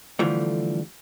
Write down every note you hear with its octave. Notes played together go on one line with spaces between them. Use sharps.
D3 E3 F3 G3 A3